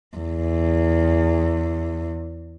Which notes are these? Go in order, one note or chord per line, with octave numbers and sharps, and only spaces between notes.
E2